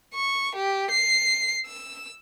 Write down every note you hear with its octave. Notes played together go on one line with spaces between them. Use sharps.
C#6
G4
C7
E6